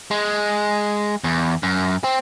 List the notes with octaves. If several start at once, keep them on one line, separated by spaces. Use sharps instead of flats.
G#3
E2
F#2
C4